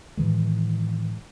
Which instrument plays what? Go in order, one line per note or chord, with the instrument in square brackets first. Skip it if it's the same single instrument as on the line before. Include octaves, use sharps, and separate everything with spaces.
[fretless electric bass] A2 D#3 E3 G#3